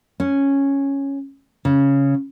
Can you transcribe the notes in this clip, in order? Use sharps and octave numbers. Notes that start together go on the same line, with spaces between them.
C#4
C#3